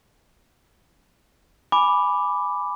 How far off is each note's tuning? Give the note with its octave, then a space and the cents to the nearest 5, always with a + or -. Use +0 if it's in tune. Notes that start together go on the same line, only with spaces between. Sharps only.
G#5 +0 B5 +0 D6 +0